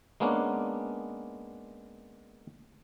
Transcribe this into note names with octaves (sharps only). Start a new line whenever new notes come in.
G#3 A#3 B3 C#4 D4